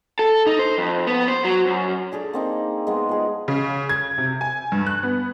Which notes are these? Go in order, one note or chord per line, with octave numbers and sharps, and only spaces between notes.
A4
D#4
C5
F2
B3
C5
F#3
F#2
D4 G#4 A4 D6
A#3 C4 D#4
G#3 B3
F3 G#4
C#3
G#6
C3
G#5
G2
F#6
B3